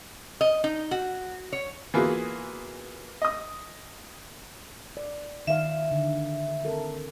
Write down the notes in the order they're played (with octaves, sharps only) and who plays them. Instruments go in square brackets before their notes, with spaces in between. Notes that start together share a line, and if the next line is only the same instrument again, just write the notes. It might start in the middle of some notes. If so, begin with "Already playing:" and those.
[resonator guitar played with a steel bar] D#5
D#4
F#4
C#5
[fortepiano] E3 A#3 B3 F4 F#4 G#4
D#5 D#6
[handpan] D5
[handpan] D#3 F5 [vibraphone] E5
[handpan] D3
C4 A4 A#4